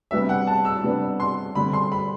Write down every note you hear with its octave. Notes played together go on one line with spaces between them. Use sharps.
C3 G3 B3 D4 E5
F#5
A5
E6
C3 G3 B3 D4
C6
D3 G3 C4 B5
C6
B5